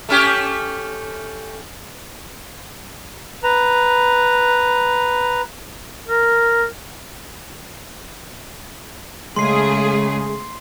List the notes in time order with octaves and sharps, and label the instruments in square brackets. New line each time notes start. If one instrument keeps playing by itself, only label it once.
[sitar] A3 C#4 G4
[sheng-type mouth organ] B4 A#5
[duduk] A#4
[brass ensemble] C#3 [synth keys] G#3 [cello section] A3 G#4 [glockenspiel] C6 C7